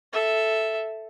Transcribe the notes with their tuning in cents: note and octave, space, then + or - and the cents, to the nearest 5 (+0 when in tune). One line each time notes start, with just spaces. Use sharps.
A4 +0 E5 +0